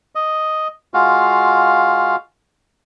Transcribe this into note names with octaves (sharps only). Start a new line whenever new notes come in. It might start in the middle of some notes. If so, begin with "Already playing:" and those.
D#5
G#3 F4 F#4 F5